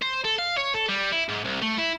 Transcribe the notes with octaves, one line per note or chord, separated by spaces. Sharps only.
C5
A4
F5
C#5
A4
G3
E4
G#2
C2
A3
E4